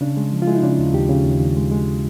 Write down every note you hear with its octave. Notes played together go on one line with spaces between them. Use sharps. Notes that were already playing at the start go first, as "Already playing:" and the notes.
C#3 D4
G#3
F3
F4
G#3 E4
D#4
C#3 D4
D#2
D#2 G4
C#3
D#2
D#2
G#3
G#3